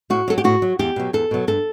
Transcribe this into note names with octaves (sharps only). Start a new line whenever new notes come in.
A2 F#4
F#3 A4
G4
A2 F#4
F#3
E2 G4
B2 F#3
E2 A4
B2 F#3
G2 A4